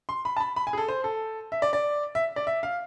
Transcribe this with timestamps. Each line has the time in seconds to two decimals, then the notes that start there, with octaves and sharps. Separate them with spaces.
0.09 C6
0.25 B5
0.37 A5
0.40 B5
0.56 B5
0.67 G#5
0.73 G#4
0.78 A4
0.88 C5
1.04 A4
1.52 E5
1.62 D5
1.73 D5
2.15 E5
2.36 D5
2.47 E5
2.63 F5